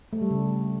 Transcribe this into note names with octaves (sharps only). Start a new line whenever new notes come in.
A3
G3
C#3